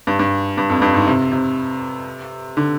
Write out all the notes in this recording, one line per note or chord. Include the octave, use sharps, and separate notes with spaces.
G2
G2
G2
F2
G2
G#2
C3
C3
D3